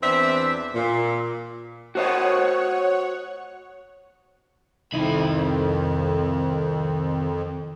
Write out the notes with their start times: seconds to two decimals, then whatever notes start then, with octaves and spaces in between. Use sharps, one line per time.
0.02 E2 E3 C4 D4 E5
0.74 A#2
1.95 F#4 C5 C#5 D#5 F#5
4.92 C2 F2 D#3 D#4 E4 B5